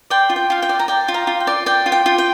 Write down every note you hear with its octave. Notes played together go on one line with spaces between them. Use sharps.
D5 G5 C6
F4
G5
F4 F5
G5
D5
A#5
D5 G5
F4
F5 A#5
F4
G5
D5
D5 G5
F4
G5
F4
G5